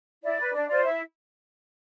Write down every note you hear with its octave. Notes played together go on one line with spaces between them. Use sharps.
E4 D5
B4
D4 D5
F4 C5 D5
E4 E5